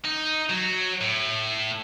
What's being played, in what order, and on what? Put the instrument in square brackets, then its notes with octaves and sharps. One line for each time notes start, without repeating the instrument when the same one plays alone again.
[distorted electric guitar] D#4
F#3
A2